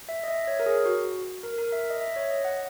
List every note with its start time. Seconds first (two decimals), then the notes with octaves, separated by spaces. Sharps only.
0.09 E5
0.23 D#5
0.28 E5
0.48 C#5
0.60 A#4
0.66 G#4
0.85 F#4
1.43 A#4
1.58 A#4
1.72 E5
1.90 D#5
2.01 E5
2.16 C#5
2.30 D#5
2.45 F#5